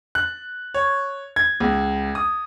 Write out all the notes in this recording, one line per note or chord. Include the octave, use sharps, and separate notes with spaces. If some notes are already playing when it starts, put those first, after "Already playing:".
F#6
C#5
G#6
C#2
D#6